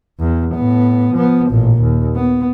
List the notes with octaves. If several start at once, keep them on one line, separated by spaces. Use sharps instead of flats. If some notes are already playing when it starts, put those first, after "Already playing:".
E2
A2 B3
F3 B3
A1 A#2
D#2
B3